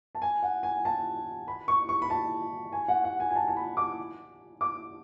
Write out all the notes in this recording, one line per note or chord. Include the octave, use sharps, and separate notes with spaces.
A5
G#5
F#5
G#5
A5
B5
C#6
C#6
B5
A5
G#5
F#5
F#5
G#5
G#5
A5
A5
B5
D6
D6